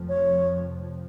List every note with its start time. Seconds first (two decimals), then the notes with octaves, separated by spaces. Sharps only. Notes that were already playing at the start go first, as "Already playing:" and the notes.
Already playing: F1 F2 F3
0.09 C#5